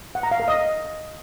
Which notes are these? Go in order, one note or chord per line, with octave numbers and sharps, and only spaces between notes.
F#5
A#5
F5
A#4
D#5